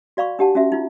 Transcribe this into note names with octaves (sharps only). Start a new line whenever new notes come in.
F#4 D5 F5 B5 C#6
D4 G4 F#5 A5
C#4 F#4 E5
D#4 F4